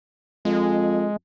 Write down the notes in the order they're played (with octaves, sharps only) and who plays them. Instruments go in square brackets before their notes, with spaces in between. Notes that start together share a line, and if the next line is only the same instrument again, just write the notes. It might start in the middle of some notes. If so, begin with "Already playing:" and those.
[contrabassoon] F2 [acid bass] G#3